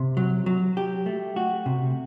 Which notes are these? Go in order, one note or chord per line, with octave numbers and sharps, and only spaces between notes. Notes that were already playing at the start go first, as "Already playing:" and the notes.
Already playing: C3
F#3
F#3
G4
A3
F#4
C3